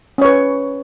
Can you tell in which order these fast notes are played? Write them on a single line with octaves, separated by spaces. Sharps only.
C#4 C#5 B4